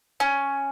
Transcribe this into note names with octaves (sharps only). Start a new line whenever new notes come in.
C#4